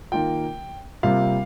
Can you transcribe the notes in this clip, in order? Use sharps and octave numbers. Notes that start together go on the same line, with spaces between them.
D#3 A#3 F4 G5
C3 G3 A#3 F4 F5